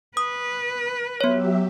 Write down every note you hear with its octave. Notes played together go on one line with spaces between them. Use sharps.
B4 D#6
F#3 B3 G4 C#5 E5